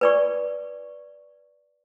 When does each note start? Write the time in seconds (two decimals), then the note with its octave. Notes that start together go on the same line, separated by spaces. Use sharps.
0.01 B4 D5 C#6